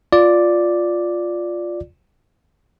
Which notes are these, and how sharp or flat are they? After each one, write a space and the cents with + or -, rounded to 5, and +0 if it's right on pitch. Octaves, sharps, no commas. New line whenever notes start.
F4 +5 D5 +0